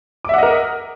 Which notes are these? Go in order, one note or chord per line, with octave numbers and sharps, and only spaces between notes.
A#4 D#5 E5 F#5 D6